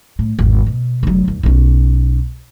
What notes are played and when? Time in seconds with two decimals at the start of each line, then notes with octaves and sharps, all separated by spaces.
0.19 A2
0.39 G#1 E2
0.67 B2
1.03 F1 F#3
1.28 D#2
1.43 B1 C#4